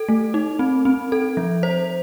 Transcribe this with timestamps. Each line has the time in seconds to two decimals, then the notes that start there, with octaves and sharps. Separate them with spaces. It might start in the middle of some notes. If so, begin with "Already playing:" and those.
Already playing: A4
0.09 A3
0.34 D#4
0.59 C4
0.85 C4
1.12 A4
1.37 F3
1.63 C5